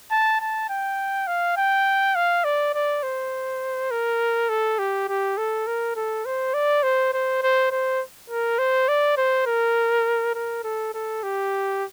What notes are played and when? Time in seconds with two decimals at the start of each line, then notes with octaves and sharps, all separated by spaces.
0.11 A5
0.41 A5
0.70 G5
1.27 F5
1.57 G5
2.16 F5
2.45 D5
2.74 D5
3.03 C5
3.91 A#4
4.49 A4
4.79 G4
5.08 G4
5.38 A4
5.67 A#4
5.96 A4
6.25 C5
6.54 D5
6.83 C5
7.14 C5
7.43 C5
7.71 C5
8.30 A#4
8.59 C5
8.88 D5
9.17 C5
9.46 A#4
10.35 A#4
10.64 A4
10.94 A4
11.23 G4